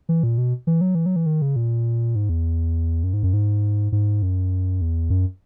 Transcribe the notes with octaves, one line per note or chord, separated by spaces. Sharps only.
E3
A#2
B2
E3
F#3
E3
F#3
E3
D#3
C#3
A#2
G#2
E2
F#2
G#2
F#2
G#2
G#2
F#2
E2
F#2